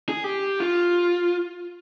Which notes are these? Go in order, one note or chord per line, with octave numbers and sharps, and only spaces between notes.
G#4
G4
F4